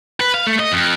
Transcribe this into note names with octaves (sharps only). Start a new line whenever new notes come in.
B4
F5
A3
D#5
F2